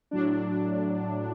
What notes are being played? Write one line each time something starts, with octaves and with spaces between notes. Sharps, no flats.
A2 F#3 D4